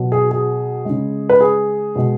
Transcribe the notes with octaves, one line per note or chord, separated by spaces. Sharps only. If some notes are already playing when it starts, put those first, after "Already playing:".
Already playing: B2 F#3
G#4
G#4
C#3 G#3
B4
G#4
B2 G#3